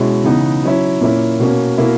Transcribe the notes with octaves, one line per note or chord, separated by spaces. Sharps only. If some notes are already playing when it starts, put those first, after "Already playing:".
Already playing: B2 G#3 C#4 E4
C#3 E3 B3 D#4
F#3 C#4 E4
A#2 A#3 C#4 E4
B2 A#3 C#4
B2 A#3 E4